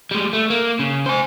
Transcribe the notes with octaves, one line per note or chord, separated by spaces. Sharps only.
G3 G#3
A3
A#3
C#3
C5 G#5